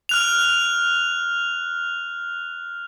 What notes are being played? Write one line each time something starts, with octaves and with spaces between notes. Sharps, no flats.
F6 F#6 F7